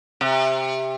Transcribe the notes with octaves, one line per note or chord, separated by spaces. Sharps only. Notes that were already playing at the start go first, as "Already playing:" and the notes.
C3